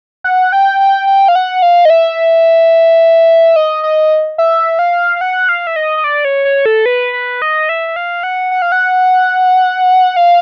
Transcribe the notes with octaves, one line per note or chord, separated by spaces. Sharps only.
F#5
G5
G5
G5
F5
F#5
F5
D#5
E5
D#5
D#5
E5
F5
F5
F#5
F5
E5
D#5
D#5
D5
C#5
C#5
A4
B4
B4
D#5
E5
E5
F5
F#5
F#5
F5
F#5
F5